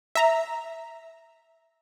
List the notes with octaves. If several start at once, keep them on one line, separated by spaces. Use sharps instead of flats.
E5 A#5